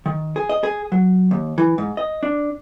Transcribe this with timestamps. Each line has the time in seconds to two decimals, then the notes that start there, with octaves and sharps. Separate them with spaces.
0.06 D#3
0.36 G#4
0.49 D#5
0.63 G#4
0.92 F#3
1.31 D#2
1.58 E3
1.78 G#2
1.97 D#5
2.23 D4